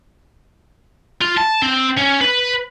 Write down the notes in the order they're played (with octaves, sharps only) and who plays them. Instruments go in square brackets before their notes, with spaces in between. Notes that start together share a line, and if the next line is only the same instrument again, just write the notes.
[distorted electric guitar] F4
A5
C4
C#4
B4